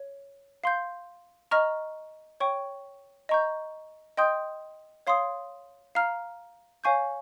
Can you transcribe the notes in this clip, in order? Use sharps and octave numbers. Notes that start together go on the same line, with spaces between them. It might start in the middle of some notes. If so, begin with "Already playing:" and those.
Already playing: C#5
F5 C6 G6
D#5 A#5 C#6 F6
C#5 G5 C#6
D#5 A#5 C#6 G6
D#5 G5 C6 D#6 G6
C#5 F5 C6 D#6
F5 A#5 F6
C#5 F5 G#5 C#6 G6